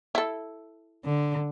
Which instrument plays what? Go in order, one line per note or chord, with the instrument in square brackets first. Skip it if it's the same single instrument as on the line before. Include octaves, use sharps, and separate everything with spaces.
[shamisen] E4 A4
[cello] D3